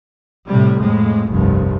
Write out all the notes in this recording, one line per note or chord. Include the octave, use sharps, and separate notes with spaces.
A2 C3 G3
F2 A2 G#3
F1 C2 G2